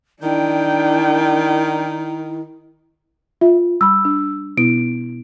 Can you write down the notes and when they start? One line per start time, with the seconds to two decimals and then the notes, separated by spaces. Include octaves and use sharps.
0.22 D#3 D4 E4 G5
3.41 F4 E5
3.81 G3 B5 E6
4.05 D4
4.58 B2 B3 E4 D7